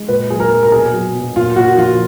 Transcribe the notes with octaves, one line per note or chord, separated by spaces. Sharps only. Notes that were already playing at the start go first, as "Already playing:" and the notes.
Already playing: G#3
A#2 B4
F#3 G#4
A#4
A#2
A#4
B2 G#4
F#3
B2
A#2 F4
A#2 F#4
F3 F4